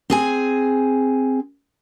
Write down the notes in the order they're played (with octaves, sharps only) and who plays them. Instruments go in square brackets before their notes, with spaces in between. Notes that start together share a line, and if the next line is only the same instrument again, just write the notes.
[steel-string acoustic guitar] C4 G#4 G#5